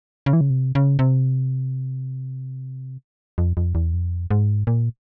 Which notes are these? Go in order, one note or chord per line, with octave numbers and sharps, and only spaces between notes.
C#3
E3
C#3
C3
C#3
C3
F2
F2
E2
F2
G#2
A#2